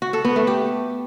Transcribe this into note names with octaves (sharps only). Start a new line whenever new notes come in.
F#4
A4
B3
A3
G4